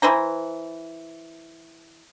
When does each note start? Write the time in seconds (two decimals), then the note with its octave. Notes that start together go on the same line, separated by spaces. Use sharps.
0.02 E3 B4 C5 A#5